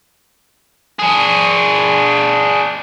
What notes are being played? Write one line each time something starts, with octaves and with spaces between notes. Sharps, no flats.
D4 G#4